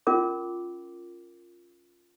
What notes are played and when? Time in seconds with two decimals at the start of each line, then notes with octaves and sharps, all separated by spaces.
0.07 C#4 F4 A#4 D6